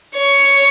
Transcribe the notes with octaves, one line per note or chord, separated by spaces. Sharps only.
C#5